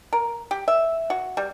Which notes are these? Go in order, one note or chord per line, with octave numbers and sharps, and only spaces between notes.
A#4
G4
E5
F#4
G3